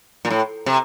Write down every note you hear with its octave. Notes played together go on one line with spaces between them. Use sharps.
A#2
A2
C3